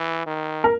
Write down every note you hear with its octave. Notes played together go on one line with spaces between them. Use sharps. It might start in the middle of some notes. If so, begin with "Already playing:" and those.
Already playing: E3
D#3
A#4